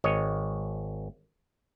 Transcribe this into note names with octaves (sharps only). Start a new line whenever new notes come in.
G#1 C#5 D#5